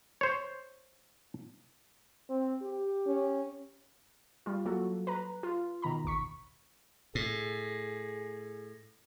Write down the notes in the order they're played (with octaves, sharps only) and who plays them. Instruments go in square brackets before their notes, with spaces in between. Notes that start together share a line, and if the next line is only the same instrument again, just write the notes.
[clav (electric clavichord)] C5 C#5
[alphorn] C4
G4
[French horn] C#4
[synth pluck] G3 F4
F#3 A#3 F#4 A4
B4 A#5
F4
B2 D#3 A#5 B5
A1 D#2 C#6 B6
[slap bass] A2 [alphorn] G#4